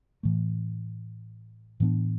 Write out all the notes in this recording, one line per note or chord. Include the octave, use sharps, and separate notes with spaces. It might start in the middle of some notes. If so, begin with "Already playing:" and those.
A2 E3 A3
A2 E3 B3 D4